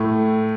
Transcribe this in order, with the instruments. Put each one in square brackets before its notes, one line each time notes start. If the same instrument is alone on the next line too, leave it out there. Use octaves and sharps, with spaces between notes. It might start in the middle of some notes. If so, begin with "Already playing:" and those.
Already playing: [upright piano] A2 A3